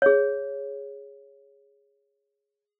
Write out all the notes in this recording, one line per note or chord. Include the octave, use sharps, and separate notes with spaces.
G#4 C#5